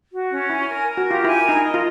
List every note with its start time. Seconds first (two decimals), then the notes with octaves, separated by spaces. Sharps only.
0.12 F#4
0.31 C#4
0.49 E4 G#5
0.69 A#4
0.86 A#4
0.97 F#4
1.06 F4 G4
1.24 E4 G#5
1.43 A#4
1.49 D#4
1.61 D#5
1.74 F4